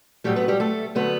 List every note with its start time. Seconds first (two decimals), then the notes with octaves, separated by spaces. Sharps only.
0.24 A2 F#3 G3 A3 G4
0.36 B3 B4
0.48 G3 G4
0.60 A3 A4
0.95 D3 F#3 A3 B3 B4